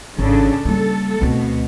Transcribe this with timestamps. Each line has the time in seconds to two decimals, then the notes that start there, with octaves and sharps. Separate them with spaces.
0.19 G#1 C#3 D4 A4
0.65 G3 A#3 A4
1.21 D2 B2 C4